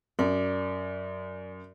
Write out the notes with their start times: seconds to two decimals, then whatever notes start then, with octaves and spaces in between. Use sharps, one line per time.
0.19 F#2 D5